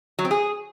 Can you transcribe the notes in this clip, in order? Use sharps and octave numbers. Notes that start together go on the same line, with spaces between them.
F#3
C4
G#4